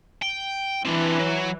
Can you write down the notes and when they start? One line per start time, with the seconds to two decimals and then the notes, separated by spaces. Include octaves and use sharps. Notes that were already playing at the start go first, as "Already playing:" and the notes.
0.22 G5
0.85 E3 C4 D4
1.19 F#3